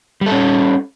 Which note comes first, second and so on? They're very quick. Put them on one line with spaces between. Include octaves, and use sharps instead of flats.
G3 A4 C#4